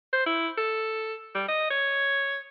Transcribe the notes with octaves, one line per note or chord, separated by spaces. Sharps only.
C5
E4
A4
G3
D#5
C#5